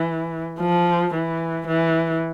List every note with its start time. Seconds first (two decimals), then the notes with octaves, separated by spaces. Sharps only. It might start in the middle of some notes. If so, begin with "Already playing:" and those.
Already playing: E3
0.60 F3
1.14 E3
1.67 E3